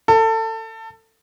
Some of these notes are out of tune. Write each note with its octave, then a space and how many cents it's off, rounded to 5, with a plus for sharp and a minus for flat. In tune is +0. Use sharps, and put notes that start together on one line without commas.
A4 +25